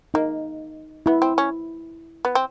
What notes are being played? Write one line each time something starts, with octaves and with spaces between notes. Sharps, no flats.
A#3 D#4
B3 E4
C4
C#4
B3
C4